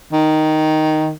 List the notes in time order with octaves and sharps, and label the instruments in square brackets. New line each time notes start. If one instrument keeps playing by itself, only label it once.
[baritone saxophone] D#3